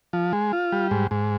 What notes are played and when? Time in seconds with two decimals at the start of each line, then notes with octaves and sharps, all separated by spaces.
0.13 F3
0.33 G#3
0.53 F4
0.72 G3
0.91 G#2
1.11 G#2